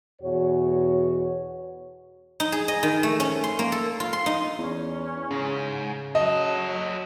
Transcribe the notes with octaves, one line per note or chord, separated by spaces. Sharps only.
E2 B2 F#4 C#5
D#4
G#4
D#5
D#3
A3
C#4
C6
A#3
A4
F4
C6
D#4
E2 C#4
G#2 C#3
F#3 F#4 A4 D#5